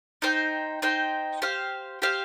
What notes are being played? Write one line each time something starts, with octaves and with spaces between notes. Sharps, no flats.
D#4 C5 G5
D#4 C5 G5
G4 C5 F5
G4 C5 F5